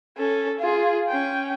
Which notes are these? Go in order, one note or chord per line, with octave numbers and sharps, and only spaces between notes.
C#4 A4
F4 G#4
C#4 G5